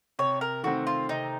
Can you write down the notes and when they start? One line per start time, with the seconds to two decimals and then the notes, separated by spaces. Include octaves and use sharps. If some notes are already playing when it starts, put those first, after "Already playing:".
0.19 C3 C#5
0.41 A#4
0.63 D#3 A3 C4 F#4
0.87 F4
1.09 C3 D#4